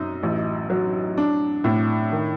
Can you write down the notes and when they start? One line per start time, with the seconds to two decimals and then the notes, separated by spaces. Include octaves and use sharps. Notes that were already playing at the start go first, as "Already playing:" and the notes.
Already playing: F#2 D#4
0.23 A1
0.70 F#3
1.17 D4
1.64 A2
2.12 D#3